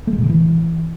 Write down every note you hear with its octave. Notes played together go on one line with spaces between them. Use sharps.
A3
G#3
A#2
C#3
E3